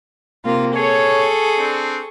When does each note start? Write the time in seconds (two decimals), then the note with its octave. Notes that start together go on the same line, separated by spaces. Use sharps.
0.44 C3 A#3 F4
0.75 G#4 A4 C#5 C#6
1.57 C4 D4